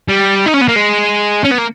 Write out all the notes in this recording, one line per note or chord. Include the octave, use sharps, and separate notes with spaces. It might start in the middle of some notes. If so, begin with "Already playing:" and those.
G3
D#4
C#4
B3
A#3
G#3
C#4
B3
A#3